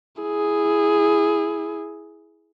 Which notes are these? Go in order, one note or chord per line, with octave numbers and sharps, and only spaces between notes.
E4 G#4